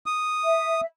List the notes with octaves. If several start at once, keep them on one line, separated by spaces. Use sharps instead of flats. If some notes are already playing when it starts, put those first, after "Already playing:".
D#6
E5